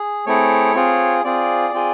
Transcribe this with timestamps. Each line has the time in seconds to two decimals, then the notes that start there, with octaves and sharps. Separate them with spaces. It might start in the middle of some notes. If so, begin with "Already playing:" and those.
Already playing: G#4
0.26 A3 C4 E4 G#4 C#5
0.75 C4 F4 G#4
1.24 C4 F4 G#4 D5
1.74 C4 F4 G#4